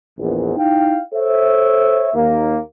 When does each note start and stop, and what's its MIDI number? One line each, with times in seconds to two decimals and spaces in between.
0.18 0.53 34
0.18 0.53 40
0.56 0.97 63
0.56 0.97 64
0.56 0.97 77
0.56 0.97 79
1.12 2.08 69
1.12 2.08 72
1.12 2.08 73
1.12 2.08 76
2.14 2.58 39
2.14 2.58 58